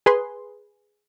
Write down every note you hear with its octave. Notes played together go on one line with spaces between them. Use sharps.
G#4 B4 C6